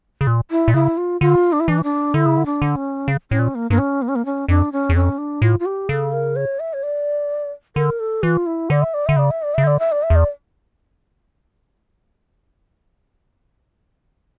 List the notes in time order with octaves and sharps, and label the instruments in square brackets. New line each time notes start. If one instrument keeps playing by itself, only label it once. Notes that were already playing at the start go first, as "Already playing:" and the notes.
[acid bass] C#3
A#2
[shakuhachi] E4
[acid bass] A#2
[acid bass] C#3 [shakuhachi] E4
[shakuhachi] F4
[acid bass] D3 [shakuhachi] F4
[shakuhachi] D4
E4
[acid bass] E3 [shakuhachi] D4
[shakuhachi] E4
D4
[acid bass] D3 [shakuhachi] E4
[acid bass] C#3
D3
[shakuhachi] D4
[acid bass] D3
[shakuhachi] C#4
[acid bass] C#3
[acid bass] A2 [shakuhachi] C#4
[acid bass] A#2
[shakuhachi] A#3
[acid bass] G2 [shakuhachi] A#3
[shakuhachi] C#4
A#3
C#4
A#3
C#4
[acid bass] F2 [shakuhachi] D4
[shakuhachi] C#4
[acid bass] E2
[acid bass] F2 [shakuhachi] C#4
[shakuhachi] D4
[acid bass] A2 [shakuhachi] F4
[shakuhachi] F4
G4
[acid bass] C#3 [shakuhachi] A4
[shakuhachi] A#4
C#5
E5
C#5
D5
[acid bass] D3 [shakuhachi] A#4
[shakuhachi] A4
[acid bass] E3 [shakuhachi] F4
[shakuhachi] E4
[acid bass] D3 [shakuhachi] D5
[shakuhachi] E5
D5
[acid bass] D3 [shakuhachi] E5
[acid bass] C#3 [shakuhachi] D5
[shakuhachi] E5
D5
[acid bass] C#3 [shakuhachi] E5
[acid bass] D3 [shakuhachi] D5
[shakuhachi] E5
D5
E5
[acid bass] E2
[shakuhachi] D5